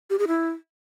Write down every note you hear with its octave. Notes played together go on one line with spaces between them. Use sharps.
G4
G#4
E4